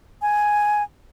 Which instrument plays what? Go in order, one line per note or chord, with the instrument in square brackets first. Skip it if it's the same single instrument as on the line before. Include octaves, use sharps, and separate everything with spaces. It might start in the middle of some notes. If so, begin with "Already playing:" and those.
[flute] G#5